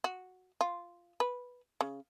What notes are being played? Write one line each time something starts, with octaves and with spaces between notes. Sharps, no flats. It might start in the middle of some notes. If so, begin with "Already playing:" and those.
F#4
F4
B4
C#3